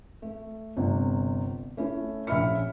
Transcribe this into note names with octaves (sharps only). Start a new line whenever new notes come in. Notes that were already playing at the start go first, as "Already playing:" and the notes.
A3
G1 C3
A3 C#4 E4
A#1 C#4 E5 B5 F6 C#7